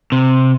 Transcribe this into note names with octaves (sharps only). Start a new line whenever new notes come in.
C3